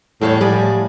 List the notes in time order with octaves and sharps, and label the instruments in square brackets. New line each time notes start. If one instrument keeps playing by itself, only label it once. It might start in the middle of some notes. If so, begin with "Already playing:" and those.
[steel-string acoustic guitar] E2 G3 C#5 [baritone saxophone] A2
[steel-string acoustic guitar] A2 F3 G#5 [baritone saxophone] G3